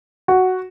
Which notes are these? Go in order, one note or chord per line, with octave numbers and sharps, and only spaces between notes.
F#4